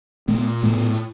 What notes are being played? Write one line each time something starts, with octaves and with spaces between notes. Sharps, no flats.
A#2 A3 B3
A2 A3 B3